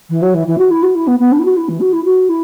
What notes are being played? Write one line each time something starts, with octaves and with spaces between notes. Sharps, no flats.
E3
F#3
E3
E3
F#4
E4
F#4
E4
B3
B3
D4
E4
F#4
E4
E3
F#4
E4
F#4
E4